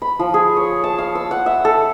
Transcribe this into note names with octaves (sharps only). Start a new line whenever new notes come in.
B5
F3
G#4
C#5
A5
F5
E6
F#5
E5
A4